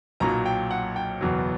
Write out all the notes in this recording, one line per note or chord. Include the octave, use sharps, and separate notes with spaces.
B1 A#2 F#3 A#5
G5
F#5
G5
F#1 E2 B2 F#3